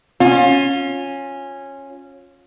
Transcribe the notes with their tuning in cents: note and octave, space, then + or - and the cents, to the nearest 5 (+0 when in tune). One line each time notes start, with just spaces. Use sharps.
C#4 -10 F4 +25